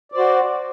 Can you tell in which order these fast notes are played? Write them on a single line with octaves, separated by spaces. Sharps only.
D5 C5 F#4